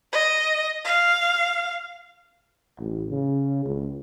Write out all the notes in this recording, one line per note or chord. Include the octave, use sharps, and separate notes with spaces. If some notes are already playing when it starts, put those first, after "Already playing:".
D#5
F5
A1
C#3
C#2